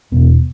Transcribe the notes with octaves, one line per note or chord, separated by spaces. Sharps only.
E2 B2 B3